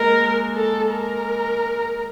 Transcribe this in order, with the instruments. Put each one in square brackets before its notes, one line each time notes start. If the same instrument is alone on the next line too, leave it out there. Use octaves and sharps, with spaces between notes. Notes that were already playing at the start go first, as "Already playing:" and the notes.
Already playing: [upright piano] G#3 A#3 [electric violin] A#4
[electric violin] A4
A#4